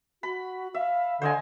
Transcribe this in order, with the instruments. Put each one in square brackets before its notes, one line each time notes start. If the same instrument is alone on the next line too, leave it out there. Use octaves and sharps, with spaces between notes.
[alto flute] F#4 [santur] B5
[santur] E5 [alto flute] F5
[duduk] D3 [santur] C5 D#5 G#5